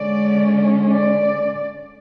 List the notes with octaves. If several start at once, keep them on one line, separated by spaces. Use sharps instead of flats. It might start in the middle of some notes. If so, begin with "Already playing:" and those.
Already playing: D3 G#3 C#4 D5
D5